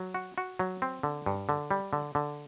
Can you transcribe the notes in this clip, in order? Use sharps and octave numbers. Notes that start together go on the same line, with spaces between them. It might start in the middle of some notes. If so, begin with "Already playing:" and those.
Already playing: F#3
F#4
F#4
F#3
C4
D3
G2
D3
G3
D3
D3